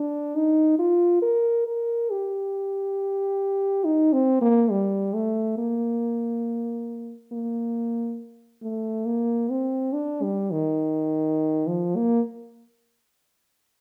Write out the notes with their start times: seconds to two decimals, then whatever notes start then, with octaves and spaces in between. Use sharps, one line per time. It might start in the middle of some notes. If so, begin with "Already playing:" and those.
Already playing: D4
0.35 D#4
0.79 F4
1.22 A#4
1.66 A#4
2.11 G4
3.85 D#4
4.13 C4
4.42 A#3
4.71 G3
5.14 A3
5.58 A#3
7.32 A#3
8.63 A3
9.06 A#3
9.50 C4
9.93 D4
10.22 G3
10.52 D#3
11.67 F3
11.96 A#3